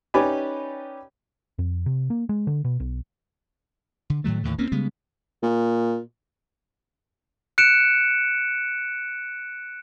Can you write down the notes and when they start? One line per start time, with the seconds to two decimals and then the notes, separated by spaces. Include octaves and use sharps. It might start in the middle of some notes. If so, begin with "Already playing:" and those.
0.14 C#4 D#4 G4 B4 D5 G#5
1.59 F2
1.86 C3
2.10 A#3
2.29 G#3
2.47 D3
2.65 B2
2.80 B1
4.10 D3
4.24 A2 D#3 F#3 A3
4.44 D#2 A2 D3
4.58 D2 A#3 C4 C#4
4.72 C#3 G3 G#3 B3
5.43 A#2
7.58 F#6 C#7 D7 E7